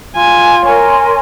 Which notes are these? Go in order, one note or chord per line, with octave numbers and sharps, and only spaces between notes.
F4 G#5
A#4 C#5 G#5 C6